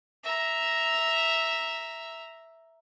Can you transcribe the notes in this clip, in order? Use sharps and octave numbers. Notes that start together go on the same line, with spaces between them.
E5 A#5